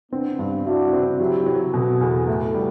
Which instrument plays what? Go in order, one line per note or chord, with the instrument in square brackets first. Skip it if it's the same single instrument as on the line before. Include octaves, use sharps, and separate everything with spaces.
[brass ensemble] B3 D4 [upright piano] C4
[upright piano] G2
[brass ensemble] D4 F#4 [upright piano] E4
[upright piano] C4
[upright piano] F#3 [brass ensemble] E4 G4
[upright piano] F#3
[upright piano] B2 [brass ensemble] F#4 A4
[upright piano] E2
A2
G3